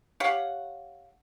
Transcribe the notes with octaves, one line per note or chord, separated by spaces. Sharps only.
G4 C#5 F5 F#5